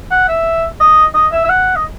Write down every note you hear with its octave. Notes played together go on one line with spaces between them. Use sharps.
F#5
E5
D#5
D#5
E5
E5
F#5
D#5